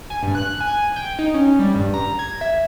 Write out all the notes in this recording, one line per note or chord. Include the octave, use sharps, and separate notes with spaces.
G#5
G2
F#6
G#5
G5
D#4
C#4
G3
G2
A#5
G#6
E5